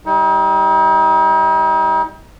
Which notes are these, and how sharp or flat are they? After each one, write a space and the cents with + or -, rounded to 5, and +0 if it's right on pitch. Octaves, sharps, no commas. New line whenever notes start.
G3 +0 D#4 +40